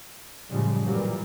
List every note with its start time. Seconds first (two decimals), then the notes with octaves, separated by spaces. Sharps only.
0.50 F#2 A2 C#3 F3 G3 G#3
0.84 A#2 E3 F#3 G3 A#3